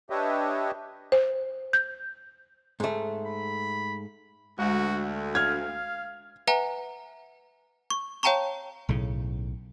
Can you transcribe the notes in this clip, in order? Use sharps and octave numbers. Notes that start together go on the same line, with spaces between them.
D4 G4 B4 C#5 D#5 E5
C5
G6
G#2 A3
B5
D2 G#3 F#4 G4 E5
F5 F6 G#6
B4 E5 F#5 G#5 A#5
C#6
C#5 F5 G5 A5 A#5 C#6
B1 A2 C#3